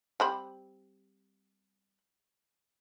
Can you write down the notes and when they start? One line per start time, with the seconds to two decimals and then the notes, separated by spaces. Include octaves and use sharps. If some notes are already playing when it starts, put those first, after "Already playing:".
0.20 G3 C4 B5